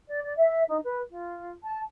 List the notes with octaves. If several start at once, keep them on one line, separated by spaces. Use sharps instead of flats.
D5
D5
E5
D#4
B4
F4
A5